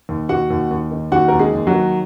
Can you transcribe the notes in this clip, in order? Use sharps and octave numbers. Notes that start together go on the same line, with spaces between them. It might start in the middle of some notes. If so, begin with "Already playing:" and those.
D#2
D#2 F#4 F#5
D#2
D#2
D#3
D#2 F#4 F#5
D#2 A#4
G#3 G#4
D#2
F#3 F#4
D#3